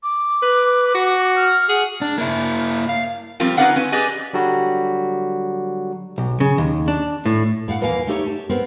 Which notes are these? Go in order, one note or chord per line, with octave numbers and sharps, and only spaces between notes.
D6
B4
F#4
F6
G#4 F#5
D4
A#3 E4
F5
F3 G3 C4 F4 G4 A#4
C#4 D#4 B4 D5 F5 F#5
C4 C#4 B4
G4 G#4 B4 D5 D#5 G#5
D3 F#3 G3 F#4
B1
C#3
D#2
D4
A2
A2 F5 F#5
D#2 E3 A#3 A#4 F5 G#5
A3 D#4 G4 A4 B4 C#5
A5
B3 C4 A#4